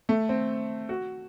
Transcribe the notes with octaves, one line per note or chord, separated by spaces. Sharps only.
A3
C4
F#4